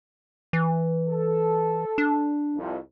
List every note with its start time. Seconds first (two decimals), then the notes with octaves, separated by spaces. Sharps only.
0.53 E3
1.09 A4
1.98 D4
2.56 C2 F2